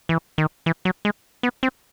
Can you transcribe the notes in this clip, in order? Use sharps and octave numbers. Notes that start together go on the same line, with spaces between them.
E3
D#3
E3
F#3
G#3
B3
C4